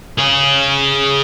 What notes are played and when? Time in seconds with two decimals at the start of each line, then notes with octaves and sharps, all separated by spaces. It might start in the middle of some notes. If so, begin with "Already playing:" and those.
0.18 G#4 C#5